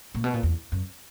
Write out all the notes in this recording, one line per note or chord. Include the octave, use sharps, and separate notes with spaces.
A#2
B2
A#2
E2
F#2